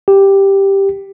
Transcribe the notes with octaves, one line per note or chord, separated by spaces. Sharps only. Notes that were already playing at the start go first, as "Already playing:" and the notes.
G4